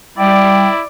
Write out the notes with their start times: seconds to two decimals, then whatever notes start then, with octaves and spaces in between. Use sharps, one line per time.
0.18 G3 E4 D5 G5